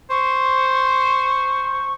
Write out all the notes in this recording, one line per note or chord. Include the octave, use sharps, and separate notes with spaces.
C5 C#6